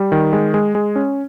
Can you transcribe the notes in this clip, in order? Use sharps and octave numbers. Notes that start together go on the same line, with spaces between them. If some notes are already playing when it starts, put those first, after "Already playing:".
Already playing: G3
D#3
G#3
G#3
G#3
C#4